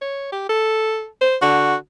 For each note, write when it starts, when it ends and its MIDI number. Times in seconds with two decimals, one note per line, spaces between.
0.01 0.31 73
0.32 0.47 67
0.49 1.07 69
1.21 1.36 72
1.42 1.75 50
1.42 1.75 66